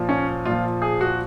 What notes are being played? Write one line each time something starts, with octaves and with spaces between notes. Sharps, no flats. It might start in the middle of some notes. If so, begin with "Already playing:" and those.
Already playing: A#2 F3
C#4
A#2 F3 F4
G#4
F#4